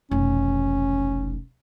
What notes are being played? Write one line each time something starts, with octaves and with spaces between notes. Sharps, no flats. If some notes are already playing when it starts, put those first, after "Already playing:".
F1 B1 C#4